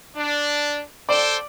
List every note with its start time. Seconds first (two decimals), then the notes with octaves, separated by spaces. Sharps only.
0.16 D4
1.09 A4 C5 D5 G5